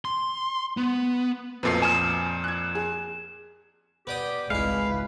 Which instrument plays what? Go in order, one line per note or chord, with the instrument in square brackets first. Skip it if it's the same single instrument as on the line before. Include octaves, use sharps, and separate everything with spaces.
[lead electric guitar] C6
B3
[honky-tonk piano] B1 A4 B4 [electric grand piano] F2 A#2 C7
[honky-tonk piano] G#5 D#6 F6 [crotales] E7
[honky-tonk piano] F#6 G#6
G#4
[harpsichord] B3 D5 D#6 [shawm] G4
[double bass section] G#1 C#2 [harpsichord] G#3 E4 [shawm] B4 [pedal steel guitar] F5